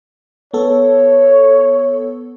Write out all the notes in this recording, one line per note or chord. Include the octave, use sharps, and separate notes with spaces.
B3 A4 C#5